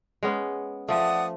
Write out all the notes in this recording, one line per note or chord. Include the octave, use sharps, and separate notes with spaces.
G#3 B3 C#4
F3 A3 D5 F#5 D#6